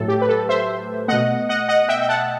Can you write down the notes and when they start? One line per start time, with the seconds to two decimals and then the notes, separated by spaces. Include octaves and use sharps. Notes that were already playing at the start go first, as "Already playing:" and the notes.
Already playing: A2 F#3 A3 A4
0.08 G4
0.21 B4
0.29 A4
0.49 C5 E5
1.08 B2 A3 D#5 F#5
1.49 D#5 F#5
1.69 D#5 F#5
1.89 E5 G5
2.02 G5
2.09 F#5 A5